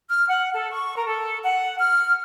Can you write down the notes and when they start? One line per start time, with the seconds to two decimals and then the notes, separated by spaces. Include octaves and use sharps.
0.08 F6
0.28 F#5
0.54 A4
0.72 C#6
0.96 A#4
1.08 A4
1.44 F#5
1.80 F6